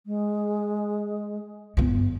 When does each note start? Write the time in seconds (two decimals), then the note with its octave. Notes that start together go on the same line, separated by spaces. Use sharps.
0.06 G#3
1.77 G2 B3